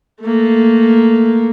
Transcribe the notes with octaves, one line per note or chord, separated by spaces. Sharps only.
A3 A#3